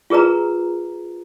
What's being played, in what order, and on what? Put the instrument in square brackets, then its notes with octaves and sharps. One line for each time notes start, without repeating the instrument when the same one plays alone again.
[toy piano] F4 G#4 A#4 B4 A#5